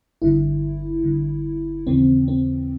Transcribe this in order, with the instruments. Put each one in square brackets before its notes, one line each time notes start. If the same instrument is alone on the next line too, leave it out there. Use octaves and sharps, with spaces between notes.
[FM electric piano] G1 G2 D3 E4
G1 G2 D3
D#2 C#3 E3 C4
C4